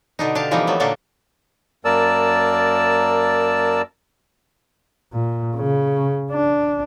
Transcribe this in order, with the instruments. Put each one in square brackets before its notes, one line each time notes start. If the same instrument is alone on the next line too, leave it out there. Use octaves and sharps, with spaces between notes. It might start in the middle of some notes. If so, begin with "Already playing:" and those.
[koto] B2 D3 D4 D#4
D4 G4 F5 A5
E3 F3 G3 A#3 C4 D#4
F#3 A3 B3
A#2 D3 F#3 A#3 D4 A4
[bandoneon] F#2 A#3 A#4 D5 A5 E6
[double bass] A#2
C#3
D4